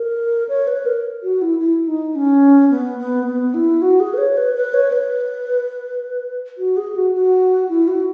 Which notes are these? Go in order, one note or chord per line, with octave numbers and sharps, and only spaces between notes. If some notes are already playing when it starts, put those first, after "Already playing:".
Already playing: A#4
C#5
B4
A#4
F#4
E4
E4
D#4
C#4
B3
B3
B3
E4
F#4
G#4
B4
C#5
B4
B4
C#5
B4
F#4
G#4
F#4
F#4
E4
F#4